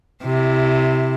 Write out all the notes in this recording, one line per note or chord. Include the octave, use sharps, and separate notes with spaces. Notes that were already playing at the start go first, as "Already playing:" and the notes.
C3 E4